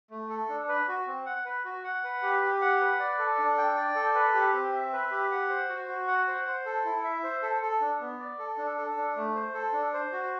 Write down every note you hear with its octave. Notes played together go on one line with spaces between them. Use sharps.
A3
A4
D4
B4
F#4
C4
F#5
B4
F#4
F#5
B4
G4
G4
F#5
B4
D5
A4
D4
G5
D5
A4
B4
G4
C4
E5
B4
G4
F#5
C5
F#4
F#4
F#5
C5
C5
A4
E4
E5
C5
A4
A4
D4
B3
D5
A4
D4
A4
D4
A3
C5
A4
D4
C5
F#4